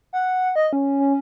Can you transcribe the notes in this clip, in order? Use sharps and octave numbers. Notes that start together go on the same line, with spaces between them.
F#5
D#5
C#4
C#4